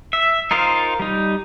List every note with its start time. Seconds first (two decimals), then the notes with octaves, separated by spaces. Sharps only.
0.13 E5
0.51 D#4 F4 A#4 C5 F5
1.00 G3 D#4